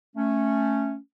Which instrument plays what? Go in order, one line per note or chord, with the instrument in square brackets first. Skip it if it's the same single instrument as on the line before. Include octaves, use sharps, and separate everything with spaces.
[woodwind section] A3 C#4